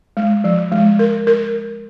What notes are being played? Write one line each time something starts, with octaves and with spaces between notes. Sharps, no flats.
G#3
F3
G#3
A#4
A#4